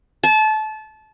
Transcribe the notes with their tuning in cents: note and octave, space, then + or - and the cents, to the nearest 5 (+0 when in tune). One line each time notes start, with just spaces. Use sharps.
A5 -25